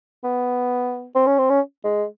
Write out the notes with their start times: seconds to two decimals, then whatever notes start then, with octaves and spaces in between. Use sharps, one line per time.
0.24 B3
1.15 C4
1.27 C#4
1.39 C4
1.50 C#4
1.84 G#3